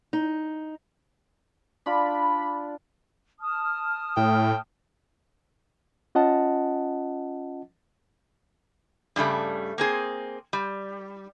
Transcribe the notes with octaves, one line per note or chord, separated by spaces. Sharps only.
D#4
D4 F4 D5 B5
A5 D#6 F6
A2 G5
C#4 F4 D#5 F#5 A5
G2 C#3 G3 A3
A#3 C4 G#4
G3